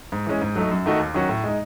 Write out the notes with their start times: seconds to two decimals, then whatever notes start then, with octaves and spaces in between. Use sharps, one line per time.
0.12 G#2
0.26 E3 G#3 C#4
0.42 G#2
0.56 F#3 A3 D#4
0.71 F#2
0.86 D#3 A3 D#4 F#4
1.00 D#2
1.14 D#3 F#3 C#4 F#4
1.29 A2
1.44 G#3 D#4